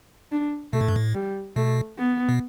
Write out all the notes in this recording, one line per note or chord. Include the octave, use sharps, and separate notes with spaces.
D4
B2 A3
A2
G2
A2
G3
B2 A3
B3
B2